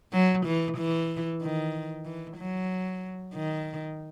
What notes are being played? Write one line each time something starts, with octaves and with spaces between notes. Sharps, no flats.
F#3
E3
E3
D#3
E3
F#3
D#3